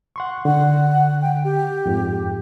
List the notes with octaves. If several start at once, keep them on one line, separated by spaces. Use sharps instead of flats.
F#5 C6 C#6
D3 F#5
G5
G4
F2 G#2